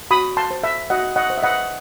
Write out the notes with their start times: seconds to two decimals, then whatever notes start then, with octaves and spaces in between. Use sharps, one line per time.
0.11 F#4 B5 D#6
0.37 A5 C6
0.51 C5
0.64 E5
0.90 F#4 D#5 F#5
1.16 D#5 F#5
1.30 C5
1.38 E5
1.43 D#5 F#5